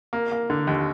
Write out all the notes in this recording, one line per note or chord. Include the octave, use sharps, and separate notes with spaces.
A#3
A#3
D3
D#2